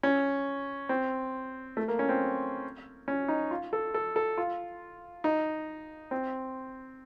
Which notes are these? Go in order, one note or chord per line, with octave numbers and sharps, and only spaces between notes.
C#4
C4
A3
A#3
C#4
C4
C#4
D#4
F4
A4
A4
A4
F4
D#4
C4